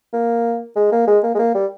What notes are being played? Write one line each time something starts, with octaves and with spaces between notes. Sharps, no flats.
A#3
G#3
A#3
G#3
A#3
G#3
A#3
G3